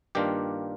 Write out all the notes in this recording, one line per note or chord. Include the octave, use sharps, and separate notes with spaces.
G2 D#3 A#3 D4 F4 G4